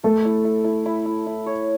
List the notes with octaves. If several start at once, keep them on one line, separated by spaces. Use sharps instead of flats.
A3 A4
E4
E4
E4
E4
E4
E4
C#5